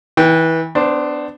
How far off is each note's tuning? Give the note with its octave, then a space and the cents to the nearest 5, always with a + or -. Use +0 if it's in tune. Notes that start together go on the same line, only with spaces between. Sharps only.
E3 -20 G5 +0
B3 +35 D4 +5 C5 +0